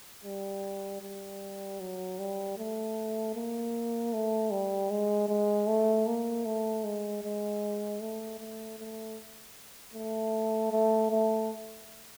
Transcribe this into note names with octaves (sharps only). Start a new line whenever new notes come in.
G3
G3
F#3
G3
A3
A#3
A3
G3
G#3
G#3
A3
A#3
A3
G#3
G#3
A3
A3
A3
A3
A3
A3